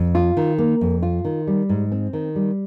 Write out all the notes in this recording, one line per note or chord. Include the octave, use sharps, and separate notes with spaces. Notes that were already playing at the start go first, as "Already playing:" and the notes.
Already playing: F2
F4
D#3
A#3
F2
F4
D#3
G3
G#2
C4
D#3
G3